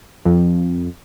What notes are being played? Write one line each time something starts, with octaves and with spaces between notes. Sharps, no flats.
F2